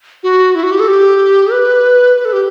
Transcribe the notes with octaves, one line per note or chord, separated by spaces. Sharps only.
F#4
E4
F#4
G4
A4
G4
B4
B4
A4
G4